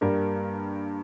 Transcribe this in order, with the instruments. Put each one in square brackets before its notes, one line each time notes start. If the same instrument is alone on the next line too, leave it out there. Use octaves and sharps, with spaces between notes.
[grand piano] G2 G3 A#3 G4 A#4